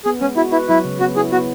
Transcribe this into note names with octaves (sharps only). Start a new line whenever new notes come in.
B3 G#4
G#3 C#4
E4 F#4
E4 B4
F#3 E4
C#3
B3 F#4
E4 G#4
B3 F#4